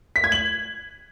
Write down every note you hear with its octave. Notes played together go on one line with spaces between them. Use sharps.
B6
G#6
F#7